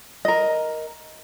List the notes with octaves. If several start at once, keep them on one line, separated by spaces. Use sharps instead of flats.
A#4 D#5